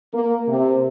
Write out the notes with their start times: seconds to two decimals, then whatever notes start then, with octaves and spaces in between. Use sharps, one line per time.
0.14 A#3
0.49 C3